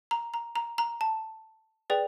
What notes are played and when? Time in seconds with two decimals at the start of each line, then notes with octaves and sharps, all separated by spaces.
0.11 A#5
0.34 A#5
0.56 A#5
0.78 A#5
1.01 A5
1.90 G#4 B4 D5 G5